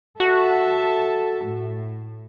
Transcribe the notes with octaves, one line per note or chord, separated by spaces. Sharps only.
F#4 A4 E5 A5
A2